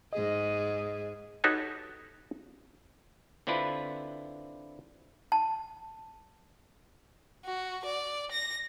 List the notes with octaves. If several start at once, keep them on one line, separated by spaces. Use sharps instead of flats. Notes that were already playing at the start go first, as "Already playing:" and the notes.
G#2 G#4 D#5
D#4 F#4 G4 A4 B4 C#5
D3 C4 D4 E4 F4 B4
A5
F#4
D5
A#6